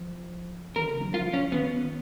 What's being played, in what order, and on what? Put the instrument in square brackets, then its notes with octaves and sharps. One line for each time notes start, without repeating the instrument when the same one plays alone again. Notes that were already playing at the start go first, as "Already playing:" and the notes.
Already playing: [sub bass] F3
[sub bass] D#3 [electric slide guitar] A#4
[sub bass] C#3
F#3
[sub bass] F3 [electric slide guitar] F4
[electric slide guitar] C#4
[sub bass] D#3 [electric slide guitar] B3